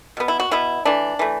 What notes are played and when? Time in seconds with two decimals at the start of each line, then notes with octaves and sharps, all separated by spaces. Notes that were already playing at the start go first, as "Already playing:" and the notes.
0.17 B2 B3
0.28 E4
0.40 F#4
0.51 B2 B3 E4
0.85 E3 A3 D4
1.19 E3 A3